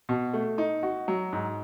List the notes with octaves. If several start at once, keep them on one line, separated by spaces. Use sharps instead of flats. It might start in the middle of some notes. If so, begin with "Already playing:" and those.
B2
A3
D#4
F#4
F#3
G#2